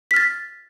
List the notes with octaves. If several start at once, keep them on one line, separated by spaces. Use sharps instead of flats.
F6 A6 B6